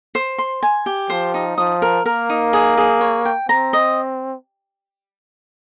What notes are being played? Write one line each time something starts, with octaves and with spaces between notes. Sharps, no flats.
C5
C6
G#5
G4
F3 C5
D#4
F3 D#6
A#4
A#3 A#4
D#4
G#4
G#4
C#5
G5
C4 A#5
D#5